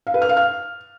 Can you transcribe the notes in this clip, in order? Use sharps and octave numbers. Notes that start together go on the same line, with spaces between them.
F5
B4
F6
F5
F6